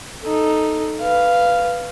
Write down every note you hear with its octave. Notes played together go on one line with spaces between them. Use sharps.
D#4 A4
B4 F5